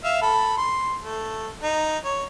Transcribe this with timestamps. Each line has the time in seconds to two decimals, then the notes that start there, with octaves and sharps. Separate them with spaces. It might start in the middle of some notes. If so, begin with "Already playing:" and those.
0.04 E5 F5
0.22 A4 B5
0.57 C6
1.02 A3
1.63 D#4
2.05 C#5